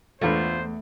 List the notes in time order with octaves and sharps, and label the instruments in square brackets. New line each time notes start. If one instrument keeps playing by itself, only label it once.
[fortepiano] E2 G2 [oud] A3 [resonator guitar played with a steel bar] B3 F4 C#5 [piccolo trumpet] C5